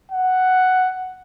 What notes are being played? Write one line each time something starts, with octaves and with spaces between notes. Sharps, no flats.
F#5